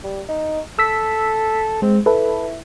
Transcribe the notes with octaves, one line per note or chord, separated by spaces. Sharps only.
G3
D#4
A4 E6 B6
G#3 C4
E4 A4 B4